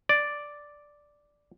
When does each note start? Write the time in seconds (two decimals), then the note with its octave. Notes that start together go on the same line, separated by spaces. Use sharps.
0.09 D5